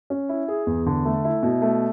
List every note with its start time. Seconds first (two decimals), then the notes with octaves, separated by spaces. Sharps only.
0.10 C#4
0.29 E4
0.48 G#4
0.67 E2
0.86 D3
1.05 A3
1.25 E4
1.43 B2
1.62 A3